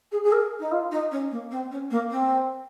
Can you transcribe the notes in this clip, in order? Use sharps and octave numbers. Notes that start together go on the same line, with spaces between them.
G#4
G#4
A#4
D#4
F4
D#4
C#4
A#3
C4
C#4
A#3
C4